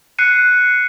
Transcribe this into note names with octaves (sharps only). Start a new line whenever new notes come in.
F#6 C7 C#7 D#7